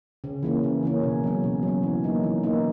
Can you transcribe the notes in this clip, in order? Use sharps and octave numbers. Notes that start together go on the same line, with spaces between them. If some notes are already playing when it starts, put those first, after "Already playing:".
C#3
E3 A#3 C#4
C#3
E3 A#3 C#4
B2
F#3 C#4
B2
F#3 C#4
E3
A#3 D#4
E3
A#3 D#4